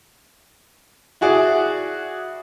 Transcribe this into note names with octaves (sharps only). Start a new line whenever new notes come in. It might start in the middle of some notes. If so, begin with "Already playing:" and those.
E4 F#4 G#4 D5